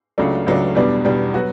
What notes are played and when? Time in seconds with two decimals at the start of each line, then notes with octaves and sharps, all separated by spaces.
0.18 C#2 C#3 F#3 A3 D4
0.47 C#2 C#3 F#3 A3 D4
0.75 E2 B2 G3 D4
1.05 E2 B2 G3 D4
1.34 F#3 B3 F#4